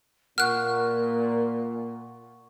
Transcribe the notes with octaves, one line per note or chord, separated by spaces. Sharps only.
A#2 A#4 F#5 C#6 F6 F#6